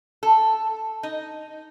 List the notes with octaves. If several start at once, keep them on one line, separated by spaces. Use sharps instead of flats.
A4
D#4